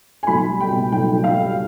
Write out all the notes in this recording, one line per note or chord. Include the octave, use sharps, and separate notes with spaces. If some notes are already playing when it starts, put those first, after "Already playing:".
G#5
B1 B5
G3
G5
B2
B1 G5
B1
F5
G3